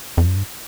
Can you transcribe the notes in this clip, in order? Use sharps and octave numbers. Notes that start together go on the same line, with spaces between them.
F2
F#2
G2